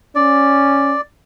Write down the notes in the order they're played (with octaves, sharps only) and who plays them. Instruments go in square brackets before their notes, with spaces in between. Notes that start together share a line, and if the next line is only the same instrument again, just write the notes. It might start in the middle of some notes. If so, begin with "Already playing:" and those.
[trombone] C#4 [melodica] D5